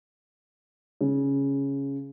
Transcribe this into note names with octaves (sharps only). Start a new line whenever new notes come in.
C#3